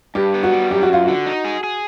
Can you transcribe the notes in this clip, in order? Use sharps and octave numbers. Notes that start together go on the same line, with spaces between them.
G2 G4
B3
F#4
G3
F#2 G4
F#4
F#2 F4
D3 F#4
D#4
G#4
G#4